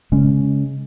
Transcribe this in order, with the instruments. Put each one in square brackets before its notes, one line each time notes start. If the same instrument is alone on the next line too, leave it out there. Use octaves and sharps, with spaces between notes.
[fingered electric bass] C#3 G#3 C#4